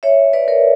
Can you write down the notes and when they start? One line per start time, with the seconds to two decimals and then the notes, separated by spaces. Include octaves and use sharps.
0.03 C#5 E5
0.33 B4 D5
0.48 A#4 C#5